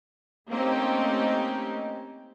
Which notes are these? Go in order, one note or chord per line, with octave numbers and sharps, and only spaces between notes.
A3 A#3 C4 C#4 D#4 G4